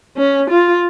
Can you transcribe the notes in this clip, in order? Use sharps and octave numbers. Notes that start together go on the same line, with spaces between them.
C#4
F4